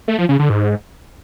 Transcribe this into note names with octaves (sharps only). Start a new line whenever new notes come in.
A3
F3
C#3
D3
G#2